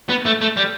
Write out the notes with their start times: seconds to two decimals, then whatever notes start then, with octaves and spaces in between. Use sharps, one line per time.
0.09 B3
0.26 A3
0.41 A3
0.57 G3